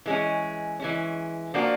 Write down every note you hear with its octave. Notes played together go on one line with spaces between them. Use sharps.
E3 G#3 C#4
E3 G#3 C#4
F3 A#3 D4 F#4